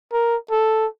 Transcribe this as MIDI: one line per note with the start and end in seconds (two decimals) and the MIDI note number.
0.13 0.36 70
0.51 0.86 69